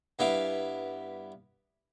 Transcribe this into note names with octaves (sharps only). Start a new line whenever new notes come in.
G2 B3 E4 F5 D6